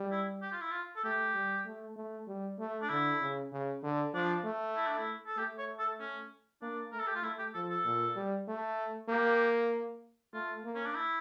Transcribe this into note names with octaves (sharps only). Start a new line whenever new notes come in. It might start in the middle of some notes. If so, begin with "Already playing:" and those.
Already playing: G3
E4
G4
F4
E4
F4
A4
A3 G4
G3
A3
A3
G3
A3
D4
D3 E4
C#3
C#3
D3
F3 D4
A3
E4
D4
E4
A4
A3 G4
C#5
A4
C#4
A#3 D4
A3 A#4
A4
G4
F4
A3 E4
G4
F3 A4
A4
A#2
G3
A3
A#3 G4
A3 F4
A#3
C#4
D4
E4